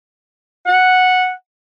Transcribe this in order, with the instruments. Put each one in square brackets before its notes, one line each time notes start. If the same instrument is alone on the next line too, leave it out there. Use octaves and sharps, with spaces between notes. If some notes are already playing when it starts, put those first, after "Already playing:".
[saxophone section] F#5